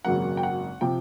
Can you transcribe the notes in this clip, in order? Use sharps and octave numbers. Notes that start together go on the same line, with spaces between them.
G#1 F#2 C#3 F#3 A#3 F#5
G5
F#5
C3 F3 G5